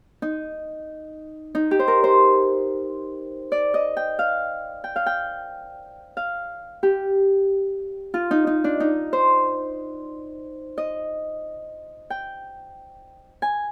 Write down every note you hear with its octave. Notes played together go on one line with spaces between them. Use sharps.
D#4
D#4
G4
C5
A#4
C5
D5
D#5
G5
F5
G5
F5
G5
F5
G4
F4
D#4
D#4
D4
D#4
C5
D#5
G5
G#5